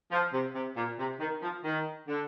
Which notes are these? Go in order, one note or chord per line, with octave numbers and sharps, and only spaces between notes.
F3
C3
C3
A#2
C3
D#3
F3
D#3
D3